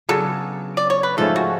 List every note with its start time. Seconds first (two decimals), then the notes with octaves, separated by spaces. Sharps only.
0.09 C#3 F#3 B3 D4 A4
0.77 D5
0.90 C#5
1.03 B4
1.17 G#2 F3 A3 C#4 A4
1.36 F#4